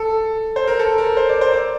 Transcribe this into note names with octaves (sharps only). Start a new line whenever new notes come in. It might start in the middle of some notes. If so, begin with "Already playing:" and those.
Already playing: A4
C5
A#4
A4
A#4
C5
D5
C5
D5